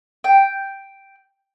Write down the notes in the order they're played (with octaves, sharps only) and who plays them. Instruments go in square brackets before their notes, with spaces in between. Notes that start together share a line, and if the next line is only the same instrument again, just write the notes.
[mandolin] G5